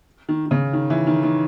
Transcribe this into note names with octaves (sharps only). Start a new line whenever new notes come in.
D#3
D#3
C#3
D#3
E3
D#3
D#3